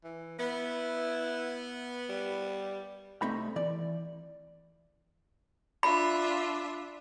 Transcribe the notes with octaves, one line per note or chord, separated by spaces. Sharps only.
E3
B3 E4
G3
C2 A3 C4 D#4 B5
E3 D5
D4 F4 E5 B5